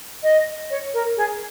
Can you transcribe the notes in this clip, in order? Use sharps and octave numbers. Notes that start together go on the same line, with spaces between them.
D#5
C#5
A#4
G#4